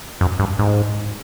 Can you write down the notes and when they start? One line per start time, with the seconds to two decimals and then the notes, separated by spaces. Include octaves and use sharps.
0.21 F#2
0.39 G2
0.59 G#2